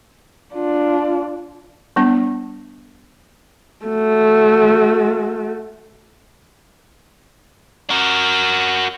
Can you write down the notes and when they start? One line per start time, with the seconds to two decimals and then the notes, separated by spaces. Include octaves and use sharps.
0.54 D4 F4
1.96 G3 B3 D4
3.86 A3 F#4
7.90 F#4 A#4